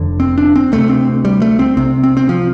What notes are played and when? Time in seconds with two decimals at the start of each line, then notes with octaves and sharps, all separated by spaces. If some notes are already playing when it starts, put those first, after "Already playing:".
Already playing: F1 F2 D3
0.20 C4
0.38 D4
0.55 C4
0.72 D2 C3 A3
0.90 C4
1.25 G3
1.42 A3
1.59 C4
1.77 C2 C3 C4
2.03 C4
2.17 C4
2.29 F3